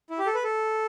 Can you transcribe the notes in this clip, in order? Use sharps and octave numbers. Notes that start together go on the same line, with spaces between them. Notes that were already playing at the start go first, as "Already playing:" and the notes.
E4
G4
A4
B4
A4